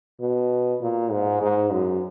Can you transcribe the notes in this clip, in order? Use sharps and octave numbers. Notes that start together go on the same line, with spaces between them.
B2
A#2
G#2
G#2
F#2